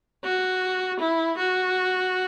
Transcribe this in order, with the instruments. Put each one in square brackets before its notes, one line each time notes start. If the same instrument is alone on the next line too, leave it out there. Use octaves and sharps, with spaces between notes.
[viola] F#4
E4
F#4